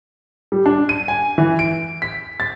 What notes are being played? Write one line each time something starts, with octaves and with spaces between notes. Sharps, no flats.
G3
D4
D#7
G#5
E3
D7
B6
A6